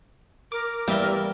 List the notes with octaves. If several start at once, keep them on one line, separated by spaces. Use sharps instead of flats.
A#4 D6
E2 G3 A#3 E5 G5